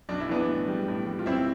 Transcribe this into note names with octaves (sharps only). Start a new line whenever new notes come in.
B1 D4
E4
E3 B3 D4
A2
G3
A2
G3
F4
B1 C4 E4